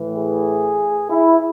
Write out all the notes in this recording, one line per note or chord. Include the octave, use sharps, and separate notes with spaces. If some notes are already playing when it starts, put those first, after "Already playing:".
Already playing: A2 E3
G#4
E4